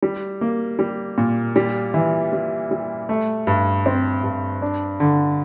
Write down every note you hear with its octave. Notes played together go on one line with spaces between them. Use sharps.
G3
A#3
G3
A#2
G3
E3
G3
G3
A3
G2
C4
G2
D4
D3